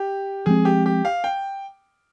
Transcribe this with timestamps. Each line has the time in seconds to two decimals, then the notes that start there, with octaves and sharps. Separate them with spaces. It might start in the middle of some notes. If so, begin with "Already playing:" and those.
Already playing: G4
0.46 F3 G#3 C4 G#4
0.65 G4
0.86 G4
1.05 F5
1.24 G5